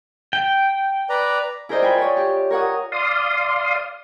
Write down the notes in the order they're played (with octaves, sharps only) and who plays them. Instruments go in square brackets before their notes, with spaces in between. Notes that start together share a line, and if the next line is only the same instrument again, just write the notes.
[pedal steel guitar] G5
[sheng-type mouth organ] B4 D5 A#5
[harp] E4 G#4 A#4 C5 D5 D#5
F4 G5 G#5 B5
C#5 D5
G4
A#4 C#5 F#5 D#6
[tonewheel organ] D5 F5 C6 D#6